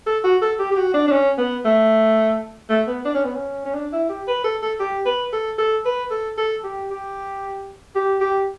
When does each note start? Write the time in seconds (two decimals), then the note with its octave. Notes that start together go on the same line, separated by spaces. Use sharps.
0.06 A4
0.24 F#4
0.41 A4
0.59 G4
0.71 G4
0.77 F#4
0.94 D4
1.07 D4
1.11 C#4
1.38 B3
1.65 A3
2.69 A3
2.87 B3
3.05 D4
3.14 C#4
3.24 B3
3.34 C#4
3.65 C#4
3.74 D4
3.92 E4
4.09 G4
4.27 B4
4.44 A4
4.62 A4
4.79 G4
5.05 B4
5.32 A4
5.58 A4
5.85 B4
6.10 A4
6.37 A4
6.63 G4
6.90 G4
7.95 G4
8.20 G4